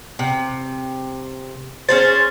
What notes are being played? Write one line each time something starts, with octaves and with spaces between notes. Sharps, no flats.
C3
C#4 G#4 C5 A6